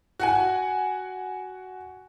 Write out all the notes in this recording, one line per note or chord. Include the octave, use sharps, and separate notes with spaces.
F#4 F#5 G#5